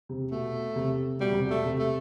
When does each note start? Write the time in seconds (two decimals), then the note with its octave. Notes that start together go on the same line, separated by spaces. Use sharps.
0.09 C3
0.31 B2 A3
0.76 C3
1.20 B2 G3
1.32 C3
1.44 B2
1.50 A3
1.64 C3
1.79 A3